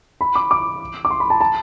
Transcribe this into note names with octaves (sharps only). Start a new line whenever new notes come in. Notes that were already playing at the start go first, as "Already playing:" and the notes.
B5
D6
D6
D6
C6
B5
A5
A5